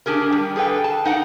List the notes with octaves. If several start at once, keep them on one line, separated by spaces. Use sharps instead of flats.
D4 G4 G#4 A#4
G3
G#4 A4 B4 G5
A5
D#4 F#5 G5